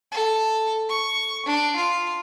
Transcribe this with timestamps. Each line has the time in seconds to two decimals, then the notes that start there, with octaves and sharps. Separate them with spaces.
0.12 A4
0.89 C#6
1.46 D4
1.76 F4